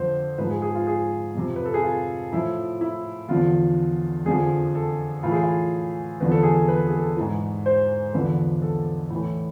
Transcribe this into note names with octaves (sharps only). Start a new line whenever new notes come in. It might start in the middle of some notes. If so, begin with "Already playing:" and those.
Already playing: F2 D3 F3 C5
G#2 F3 B4
G#4
G#4
F4
G#4
F2 C3 F3
B4
A4
G#4
F4
A2 F3 E4
E4
E2 D3 F3 F4
F2 D3 F3 G#4
A4
A2 E3 F4
G#4
F4
E2 D3 F3 B4
A4
G#4
A4
B4
A4
G#4
A4
G#2 E3
C5
E2 D3 F3 B4
A4
A2 E3